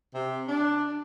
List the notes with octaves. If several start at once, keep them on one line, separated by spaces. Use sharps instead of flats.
C3
D4